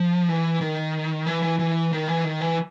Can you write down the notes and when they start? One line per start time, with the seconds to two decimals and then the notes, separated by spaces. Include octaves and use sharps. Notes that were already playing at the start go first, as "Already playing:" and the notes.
Already playing: F3
0.29 E3
0.61 D#3
1.26 E3
1.42 E3
1.59 E3
1.92 D#3
2.08 E3
2.24 D#3
2.41 E3